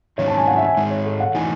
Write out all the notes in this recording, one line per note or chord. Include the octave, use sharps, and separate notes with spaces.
G#2 D#3 F#3 C#4 C#5
A5
G#5
F#5
E5
G#5
G#2 D#3 G#3
C#5
A4
F#5
E3 A3 D#4 F#4 G#5